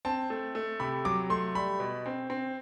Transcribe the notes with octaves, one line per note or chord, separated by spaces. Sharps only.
C4 A5
A3
A3
C3 B5
F#3 D6
A3 C6
G3 B5
B2
C4
C4